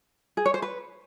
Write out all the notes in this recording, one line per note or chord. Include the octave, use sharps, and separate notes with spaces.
G#4
C#5
C5
B4